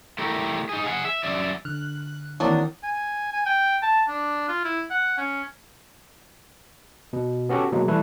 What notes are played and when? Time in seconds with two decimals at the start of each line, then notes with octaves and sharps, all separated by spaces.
0.19 A3 E4 G4 A#4
0.69 D#4 G#4
0.84 G#4 F5 F#5
1.05 E5
1.23 F#2 D5 E5
1.65 D3 F6 F#6
2.40 D#3 E3 F#3 A#3 C4 D4 E4 D#6
2.83 G#5
3.33 G#5
3.46 G5
3.82 A5
4.08 D4
4.48 F4
4.64 E4
4.90 F#5
5.18 C#4
7.13 B2
7.49 B3 C#4 F#4 G4 A4
7.72 B2 F#3 G#3 A#3
7.88 E3 G3 A3 E4 A4 B4